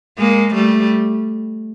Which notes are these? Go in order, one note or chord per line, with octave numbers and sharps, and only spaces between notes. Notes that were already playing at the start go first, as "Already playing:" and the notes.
G#3 A#3
G3 A3